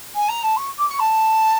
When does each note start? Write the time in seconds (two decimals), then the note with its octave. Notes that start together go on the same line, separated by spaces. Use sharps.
0.15 G#5
0.28 A#5
0.42 A5
0.56 C#6
0.78 D6
0.88 C#6
0.99 A5